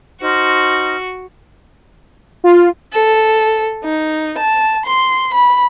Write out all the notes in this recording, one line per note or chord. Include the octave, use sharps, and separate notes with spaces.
D#4 F#4 C5 F6
F4
A4
D#4
A5
C6
B5